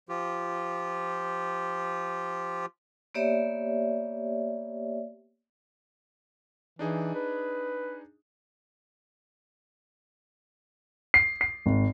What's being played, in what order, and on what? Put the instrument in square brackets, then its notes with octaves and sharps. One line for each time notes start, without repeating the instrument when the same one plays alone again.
[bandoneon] F3 F4 G4
[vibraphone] A#3 B3 G4 C#5 D5 E5
[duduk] E3 [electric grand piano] D4 D#4 G#4
[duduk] B4
[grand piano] C7
C7
G#1